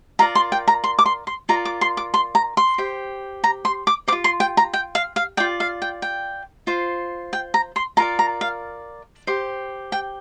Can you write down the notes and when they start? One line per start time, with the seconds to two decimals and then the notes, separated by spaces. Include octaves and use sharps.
0.19 F4 A#4 D5 A#5
0.35 C6
0.52 G5
0.68 A#5
0.84 C6
0.99 D6
1.06 C6
1.27 C6
1.49 F4 A#4 D5 A#5
1.65 D6
1.81 C6
1.97 D6
2.14 C6
2.35 A#5
2.57 C6
2.78 G4 C5
3.44 A#5
3.65 C6
3.87 D6
4.08 C5 D6
4.12 F4
4.24 C6
4.40 G5
4.57 A#5
4.74 G5
4.95 F5
5.16 F5
5.37 F4 D5 G5
5.60 F5
5.82 G5
6.02 G5
6.67 F4 C5
7.33 G5
7.54 A#5
7.76 C6
7.97 F4 A#4 D5 A#5
8.19 A#5
8.41 F5
9.27 G4 C5
9.92 G5